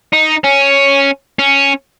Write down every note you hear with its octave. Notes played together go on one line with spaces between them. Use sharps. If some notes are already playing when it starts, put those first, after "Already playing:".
D#4
C#4
C#4